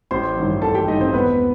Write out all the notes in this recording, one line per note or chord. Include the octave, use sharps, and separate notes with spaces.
A1 C5 C6
G2 D#3 F#3
A1 A4 A5
G4 G5
G2 D#3 F#3 D#4 D#5
C4 C5
E1 B3 B4